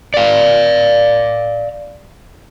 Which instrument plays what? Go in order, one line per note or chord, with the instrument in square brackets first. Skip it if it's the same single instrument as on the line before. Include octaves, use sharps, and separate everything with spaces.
[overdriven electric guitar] D5 F5